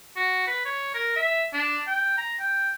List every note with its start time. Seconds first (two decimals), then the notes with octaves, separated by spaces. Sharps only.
0.17 F#4
0.47 B4
0.65 C#5
0.95 A#4
1.16 E5
1.53 D4
1.87 G5
2.18 A#5
2.40 G5